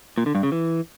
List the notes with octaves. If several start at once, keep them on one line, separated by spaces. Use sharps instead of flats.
A#2
D3
G2
C#3
E3